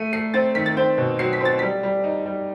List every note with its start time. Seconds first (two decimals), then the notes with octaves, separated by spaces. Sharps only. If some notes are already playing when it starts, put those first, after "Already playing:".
Already playing: A3 D#7
0.13 A3 C7
0.34 C4 A6
0.55 D#3 B6
0.66 A6
0.77 C4 G6
0.98 B2
1.19 F#3 C7
1.33 B6
1.40 C4 A6
1.59 G3 B6
1.83 G3
2.04 D#4
2.26 G3